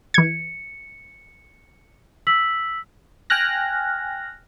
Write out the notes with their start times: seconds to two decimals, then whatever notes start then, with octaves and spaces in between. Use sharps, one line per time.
0.14 E3 G#6 C#7
2.27 E6 B6 F#7
3.30 G5 G#5 F6 F#6 A#6